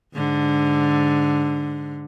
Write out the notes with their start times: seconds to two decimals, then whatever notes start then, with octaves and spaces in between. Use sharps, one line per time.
0.15 G#2 D3